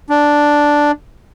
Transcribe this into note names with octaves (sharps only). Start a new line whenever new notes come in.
D4